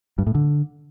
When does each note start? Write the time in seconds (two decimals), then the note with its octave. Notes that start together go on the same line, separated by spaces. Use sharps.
0.18 G2
0.27 A2
0.35 D3